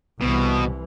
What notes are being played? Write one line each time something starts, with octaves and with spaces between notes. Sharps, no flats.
C2 B2 E3